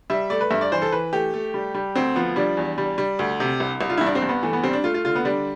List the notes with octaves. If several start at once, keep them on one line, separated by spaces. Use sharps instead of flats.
G3 E5
A3 D5
B4
G2 E5
D5
E3 C5
A4
E3 B4
A3 G4
A3
G3
G3
D2 C4
F3 B3
G3 D4
E2
G3
G3
D2
C3
C2
C2
F4
G2 E4
D4
C4
G2
B3
E3 A3
B3
G3 C4
D4
A3 F4
F4
D3 F4
B3
G3 D4